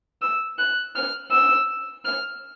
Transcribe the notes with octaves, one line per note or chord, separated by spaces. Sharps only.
E6
F#6
F6
E6
F6